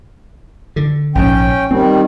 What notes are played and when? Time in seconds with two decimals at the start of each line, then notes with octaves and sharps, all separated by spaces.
0.76 D3
1.15 A#1 G#2 C#4 G5
1.71 D#3 G3 C4